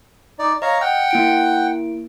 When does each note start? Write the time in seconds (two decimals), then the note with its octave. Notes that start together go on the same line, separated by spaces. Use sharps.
0.39 D#4 D5
0.62 C#5 D#5 F5 A#5
0.81 F#5 G5 F6
1.11 A#3 E4 D7